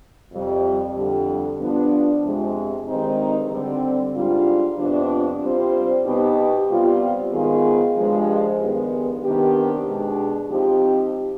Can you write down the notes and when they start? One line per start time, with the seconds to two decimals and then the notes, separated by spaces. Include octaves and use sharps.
0.32 F2 C3 G3
0.96 F2 D3 G3
1.59 G2 F3 B3 D4 F4
2.23 F2 C3 F3 G#3
2.87 G2 D#3 G#3 C4 D#4
3.50 D3 G3 C4
4.14 G#2 G3 D4 F4
4.78 F2 C3 F3 B3 D4
5.41 C3 G3 C4 F4 C5
6.05 B2 B3 D#4 G4
6.68 C3 G3 B3 F4
7.32 G#2 D#3 B3 F4 G#4
7.96 G2 F3 G#3
8.59 G2 D#3 G#3 B3
9.23 C3 D#3 B3 D4 G4
9.87 B2 G#3 D4 G4
10.50 F3 C4 D#4 G4